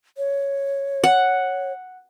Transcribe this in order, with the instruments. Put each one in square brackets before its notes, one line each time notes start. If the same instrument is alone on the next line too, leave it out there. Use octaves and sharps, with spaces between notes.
[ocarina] C#5
[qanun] F#5